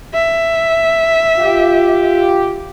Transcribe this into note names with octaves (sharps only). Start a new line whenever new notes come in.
E5
F4 G4